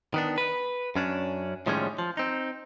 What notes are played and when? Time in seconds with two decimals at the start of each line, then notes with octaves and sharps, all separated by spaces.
0.14 D#3 B3 D4
0.38 B4
0.96 F#2 C#4 D4
1.66 A2 D#3 F3 G3 G#3 C#4
1.99 F3
2.17 C4 D#4